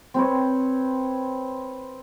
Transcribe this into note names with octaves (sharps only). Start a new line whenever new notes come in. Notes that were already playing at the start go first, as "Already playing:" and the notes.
C4 B4 C#5